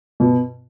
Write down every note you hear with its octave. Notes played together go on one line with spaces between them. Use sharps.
B2